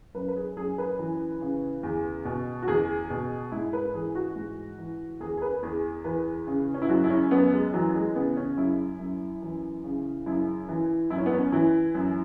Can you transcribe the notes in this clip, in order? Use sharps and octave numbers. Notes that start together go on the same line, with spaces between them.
F#2 B4
B4
G#4
F#2 G#4
B4
E3
C#3
E2
B2
F#4
E2 G#4
B2
G#2 E4
B4
E3 G#4
F#4
G#2
E3
E2 G#4
G#4
B4
E2 G#4
E3 B4
C#3
C#4
E4
F#2 F#4
E4
C#4
F#2 B3
G#3
E3 F#3
G#3
C#3 B3
C#4
F#2 E4
F#2
E3
C#3
F#2 E4
E3
F#2 E4
C#4
B3
C#4
E3 E4
F#2